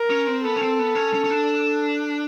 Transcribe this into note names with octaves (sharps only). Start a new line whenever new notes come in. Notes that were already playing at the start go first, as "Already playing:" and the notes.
Already playing: A#4
C#4
C4
B3 A4
C#4
C4
B3
C#4
C#4
C#4
D4